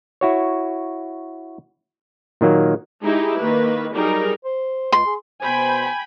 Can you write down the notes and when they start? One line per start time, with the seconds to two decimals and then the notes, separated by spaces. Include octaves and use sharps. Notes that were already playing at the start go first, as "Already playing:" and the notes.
0.21 E4 F#4 C#5
2.41 A#2 D#3 F#3 A#3
3.02 G#3 D#4 E4 G4 G#4
3.37 D#3 A#3 B4
3.94 F#3 G3 D#4 G#4 A#4
4.44 C5
4.92 C#2 C6
5.06 G#4
5.42 B2 C5 G5 G#5 B5